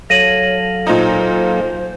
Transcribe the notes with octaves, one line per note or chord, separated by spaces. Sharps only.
F#3 A4 C#5 F5 A#6 D#7 F#7
A#2 D#4 C5